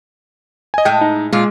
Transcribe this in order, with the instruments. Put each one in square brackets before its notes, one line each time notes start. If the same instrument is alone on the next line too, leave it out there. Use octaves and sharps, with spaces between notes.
[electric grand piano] D#5 G#5
[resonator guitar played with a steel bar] A2 G#3 [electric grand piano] G5
[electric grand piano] D#4
[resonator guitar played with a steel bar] A#2 F4 [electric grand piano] G#3